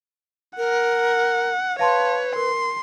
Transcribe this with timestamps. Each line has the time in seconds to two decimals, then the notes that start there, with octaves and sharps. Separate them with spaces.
0.58 A#4 F#5
1.79 B4 C#5 F5 A5 C6
2.36 A#4 C6